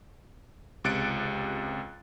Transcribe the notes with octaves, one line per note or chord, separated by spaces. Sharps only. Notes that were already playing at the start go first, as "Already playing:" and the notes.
C#2 C3 F#6 A6 C#7 D7